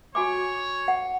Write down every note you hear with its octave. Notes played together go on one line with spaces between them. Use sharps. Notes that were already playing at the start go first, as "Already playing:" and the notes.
F#4 C#5 G#5 D6
F#5